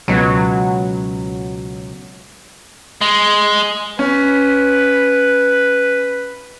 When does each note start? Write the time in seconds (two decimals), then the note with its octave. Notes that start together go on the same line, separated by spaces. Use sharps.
0.08 C#2 B2 F#3
3.01 G#3
3.99 C#4 B4